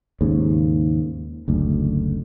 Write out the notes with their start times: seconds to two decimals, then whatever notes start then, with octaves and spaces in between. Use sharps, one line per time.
0.21 D#2 G#2 C#3
1.48 F#1 D2